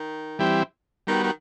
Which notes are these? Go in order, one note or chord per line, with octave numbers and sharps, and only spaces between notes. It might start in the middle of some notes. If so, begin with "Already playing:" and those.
Already playing: D#3
E3 G3 C4 E4 G4
D#3 G3 B3 F#4
D#3